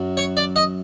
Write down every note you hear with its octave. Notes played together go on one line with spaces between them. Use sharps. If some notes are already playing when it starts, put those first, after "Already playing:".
Already playing: F#2 F#3
C#5
D5
D#5